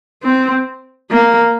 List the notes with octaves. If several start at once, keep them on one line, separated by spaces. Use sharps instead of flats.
C4
A#3